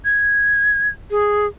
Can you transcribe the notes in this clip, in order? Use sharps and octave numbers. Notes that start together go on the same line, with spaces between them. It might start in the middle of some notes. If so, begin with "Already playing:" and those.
G#6
G#4